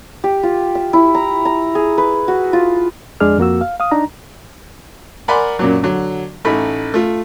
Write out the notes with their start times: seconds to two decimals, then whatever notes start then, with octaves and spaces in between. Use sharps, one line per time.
0.24 G4
0.43 F4
0.75 E5
0.93 E4
1.15 A#5
1.45 A#5
1.75 G#4
1.98 B4
2.28 F#4
2.53 F4
3.20 F2 G#3 D4 G#4 D5 F6
3.38 F2 A#3 F#4 E6
3.61 F5
3.80 F5 D#6
3.91 D4 D#4 A#5
5.28 A#4 D5 F#5 G#5 B5 C6
5.59 F#2 A#2 F#3
5.83 D3 F#3
6.45 A1 A3 D#4 B5
6.94 A3 F4